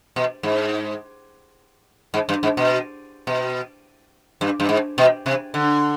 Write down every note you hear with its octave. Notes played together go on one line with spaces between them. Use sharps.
B2
G#2
G#2
G2
G#2
B2
B2
G2
G2
G#2
B2
C3
D3